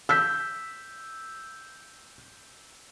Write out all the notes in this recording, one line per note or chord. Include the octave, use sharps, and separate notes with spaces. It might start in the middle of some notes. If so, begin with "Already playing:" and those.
E6 G6 B6